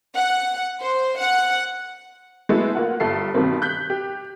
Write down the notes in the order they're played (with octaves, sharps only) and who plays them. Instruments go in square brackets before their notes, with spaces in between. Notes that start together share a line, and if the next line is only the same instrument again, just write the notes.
[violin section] F#5
C5
F#5
[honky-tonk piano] G#3 A3 B3 E4 F#4
A#3 F4 F#5
G1 G2 A4 E5 C7
G2 B2 D#3 A#3 C4
F#6 G6 B6
G4